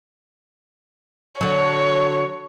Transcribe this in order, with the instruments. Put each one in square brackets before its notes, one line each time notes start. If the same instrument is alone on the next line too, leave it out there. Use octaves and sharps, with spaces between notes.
[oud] D3 F#3 [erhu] C#5